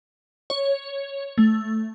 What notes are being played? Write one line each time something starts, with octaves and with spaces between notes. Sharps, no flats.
C#5
A3